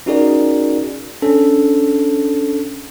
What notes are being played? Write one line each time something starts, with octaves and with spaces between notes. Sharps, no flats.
C#4 D#4 F#4 G#4 A#4 D5
C#4 D4 A4